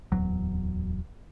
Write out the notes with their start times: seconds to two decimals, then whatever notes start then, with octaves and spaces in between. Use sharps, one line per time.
0.12 D1 E2 F#3